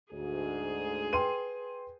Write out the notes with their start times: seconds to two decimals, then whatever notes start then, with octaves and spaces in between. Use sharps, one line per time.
0.13 D2 G#2 G#4
1.13 B4 G5 C6 D#7